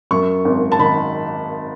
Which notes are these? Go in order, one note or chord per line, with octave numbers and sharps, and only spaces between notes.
F#2 C#6
G#1
A5
D#3 B5